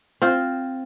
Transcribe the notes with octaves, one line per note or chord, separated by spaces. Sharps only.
C4 F4 C5